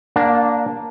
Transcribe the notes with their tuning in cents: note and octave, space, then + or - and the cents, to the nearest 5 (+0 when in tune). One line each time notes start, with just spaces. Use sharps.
A#3 +0 D4 -5 F5 +35